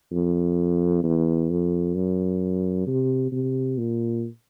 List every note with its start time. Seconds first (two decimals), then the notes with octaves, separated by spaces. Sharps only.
0.12 F2
1.03 E2
1.50 F2
1.95 F#2
2.87 C3
3.32 C3
3.78 A#2